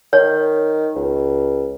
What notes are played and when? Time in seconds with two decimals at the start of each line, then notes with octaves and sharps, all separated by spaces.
0.13 D#3 C#5
0.96 C#2